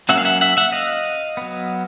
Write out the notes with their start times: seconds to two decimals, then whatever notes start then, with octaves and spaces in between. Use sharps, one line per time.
0.09 F#3 A#3 C#4 E5 F#5
0.18 F5
0.25 E5 F#5
0.41 E5 F#5
0.57 E5 F#5
0.72 D#5 F5
1.37 F#3 B3